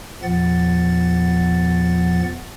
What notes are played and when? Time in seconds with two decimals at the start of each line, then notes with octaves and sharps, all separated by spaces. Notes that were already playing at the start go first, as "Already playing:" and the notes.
0.23 E2 A#2 F3 B3 F#5 A6